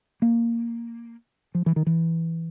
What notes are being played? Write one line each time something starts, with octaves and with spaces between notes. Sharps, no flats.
A#3
F3
E3
D#3
E3